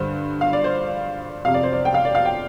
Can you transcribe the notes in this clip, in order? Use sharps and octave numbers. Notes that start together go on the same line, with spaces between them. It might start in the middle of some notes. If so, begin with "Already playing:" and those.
Already playing: G2 D3 C5
F5
D5
C5
F2 C3 F5
D5
C5
D5
G5
F5
D5
F5
G5